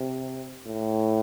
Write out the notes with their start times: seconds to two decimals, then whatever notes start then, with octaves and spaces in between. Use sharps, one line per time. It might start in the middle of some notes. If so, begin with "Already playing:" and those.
Already playing: C3
0.68 A2